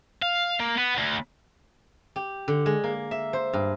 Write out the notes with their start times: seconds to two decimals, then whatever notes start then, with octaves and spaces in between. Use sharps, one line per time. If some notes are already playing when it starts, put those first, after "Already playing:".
0.22 F5
0.60 A#3
0.78 B3
0.98 D2
2.16 G4
2.48 D3
2.66 G#3
2.84 A#3
3.11 E5
3.33 C5
3.53 G2